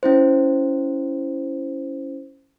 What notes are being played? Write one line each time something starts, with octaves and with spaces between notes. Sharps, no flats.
C#4 E4 C5